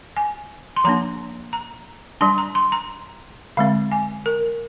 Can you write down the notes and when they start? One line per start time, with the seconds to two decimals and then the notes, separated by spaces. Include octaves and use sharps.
0.17 G#5
0.76 C6
0.84 F3 A#3 D4 A#5
1.53 A#5
2.21 G3 D4 C6
2.38 A#5
2.55 C6
2.72 A#5
3.57 D3 G#3 C4 F5
3.92 G#5
4.26 A#4